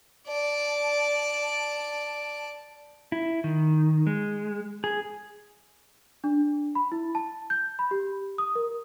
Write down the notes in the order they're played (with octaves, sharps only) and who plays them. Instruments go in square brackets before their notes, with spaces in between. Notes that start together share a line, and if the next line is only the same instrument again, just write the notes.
[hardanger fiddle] D5 A5
[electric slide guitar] E4
D#3
G#3
G#4
[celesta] D4
B5
E4
A5
G6
B5
G4
D#6
A#4